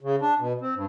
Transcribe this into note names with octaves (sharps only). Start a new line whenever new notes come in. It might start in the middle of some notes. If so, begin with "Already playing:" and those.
C#3
D4
B2
C4
G2